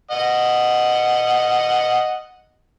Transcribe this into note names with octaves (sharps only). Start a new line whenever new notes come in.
D#5 F#5